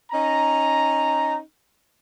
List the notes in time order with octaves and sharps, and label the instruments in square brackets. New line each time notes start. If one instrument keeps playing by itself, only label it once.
[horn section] C#4 D#4 A#5